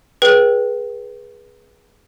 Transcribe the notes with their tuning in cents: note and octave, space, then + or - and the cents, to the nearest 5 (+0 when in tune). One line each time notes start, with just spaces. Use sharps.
G#4 +0 B4 -25 G5 -15